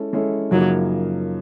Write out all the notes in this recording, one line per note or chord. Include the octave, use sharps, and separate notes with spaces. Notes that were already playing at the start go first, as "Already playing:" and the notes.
Already playing: G#3 C#4 E4 A4
G#3 C#4 E4 A4
F#2 C#3 F3 F#3 A#3 D#4